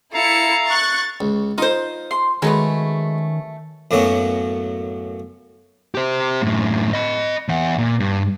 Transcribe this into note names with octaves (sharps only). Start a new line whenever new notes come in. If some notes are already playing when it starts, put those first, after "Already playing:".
E4 A4 F5 A#5 C#7
C#6 F#6 A6
C#2
D#4 F4 C5
C6
D#3 F#3 G#3 A3 B3 C#4
F#2 A2 F#3 A#3 B3 C#4
G4 C5
F#2 A2
D#5 B5
E2 F#5
A#2
G2